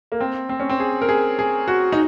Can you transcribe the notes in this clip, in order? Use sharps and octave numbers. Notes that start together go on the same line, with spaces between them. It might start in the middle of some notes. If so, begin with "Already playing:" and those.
A#3
C4
C4
C#4
C4
G#4
A#4
G#4
G#4
F#4
D#4